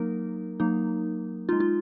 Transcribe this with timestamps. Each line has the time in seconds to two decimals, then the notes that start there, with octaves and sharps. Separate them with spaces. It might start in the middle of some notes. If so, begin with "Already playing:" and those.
Already playing: F#3 A#3 D#4 A#4
0.60 F#3 A#3 D#4
1.49 G#3 D#4 F4
1.60 F4